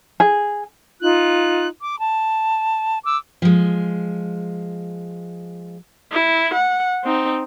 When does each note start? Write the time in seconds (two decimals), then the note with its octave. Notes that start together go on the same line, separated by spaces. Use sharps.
0.20 G#4
1.02 D#4 F4 F#6
1.83 D6
1.99 A5
3.05 D6 E6
3.42 F3 G#3
6.12 E4
6.54 F#5
7.04 C4 D#4